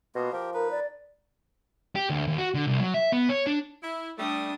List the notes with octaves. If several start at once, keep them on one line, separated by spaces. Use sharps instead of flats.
B2 A#3 B3 F4
F3 G4 A#4
D#4 A#4 B4
D5
G4
D2
D#2
F#4
D3
C2
F#3
E5
B3
C#5
D4
E4
G3 A3 D4 D#6